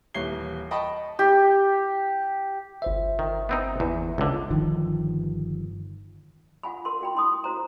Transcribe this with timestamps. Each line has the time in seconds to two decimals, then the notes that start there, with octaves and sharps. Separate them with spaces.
0.14 D#1 E3 C#5 C7 G7
0.71 D#5 G5 A5 B5 C#6
1.19 G4
2.82 G1 C5 E5
3.19 D#3
3.49 B3 C4 D#4
3.80 E2
4.18 C#2 D3
4.50 G1 D#3 F3
6.63 F4 F#5 G#5 B5
6.85 A#4 C6
7.01 F#4 G5 B5
7.15 E4 C6 D#6
7.44 E4 F#4 C5 A#5